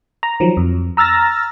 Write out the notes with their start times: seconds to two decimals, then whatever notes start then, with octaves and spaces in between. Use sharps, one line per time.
0.23 A#5
0.40 D#3 F3 F#3
0.57 F2
0.97 A#5 E6 F6 A6 A#6